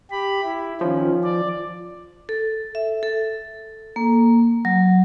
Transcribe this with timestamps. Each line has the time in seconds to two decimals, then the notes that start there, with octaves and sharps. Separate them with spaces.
0.11 G4 B5
0.43 E4
0.81 D#3 F3 C#4
1.24 D5
2.29 A4
2.75 E5
3.03 A4
3.96 A#3
4.65 F#3